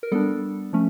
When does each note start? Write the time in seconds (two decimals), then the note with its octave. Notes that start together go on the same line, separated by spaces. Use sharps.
0.03 A#4
0.12 G3 B3 D4 A4
0.73 F3 A3 C#4